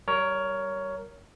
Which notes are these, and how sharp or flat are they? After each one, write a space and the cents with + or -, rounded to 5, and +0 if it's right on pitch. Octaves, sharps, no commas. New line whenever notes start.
G3 -20 A#4 +0 C#5 +15